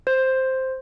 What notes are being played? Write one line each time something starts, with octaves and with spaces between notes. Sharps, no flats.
C5